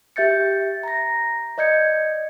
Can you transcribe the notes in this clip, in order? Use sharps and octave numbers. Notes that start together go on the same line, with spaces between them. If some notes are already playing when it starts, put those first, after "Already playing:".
G4 E5 G6 A6 C#7
A#5 A#6
D5 D#5 G6 G#6 C#7